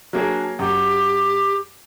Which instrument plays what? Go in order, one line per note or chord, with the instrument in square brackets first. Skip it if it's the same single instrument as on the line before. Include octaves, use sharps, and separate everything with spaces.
[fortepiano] F#3 A#3 G#4 [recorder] D4
[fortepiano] F#2 [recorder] G4